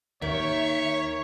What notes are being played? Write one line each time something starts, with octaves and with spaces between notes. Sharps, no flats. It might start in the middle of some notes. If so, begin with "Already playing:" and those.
D#2 D#3 C#5 E5